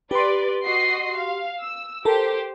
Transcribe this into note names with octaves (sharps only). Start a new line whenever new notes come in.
G4 B4 D5 C6
F#4 D#5 C7
F5
E6
G4 A4 A#4 C5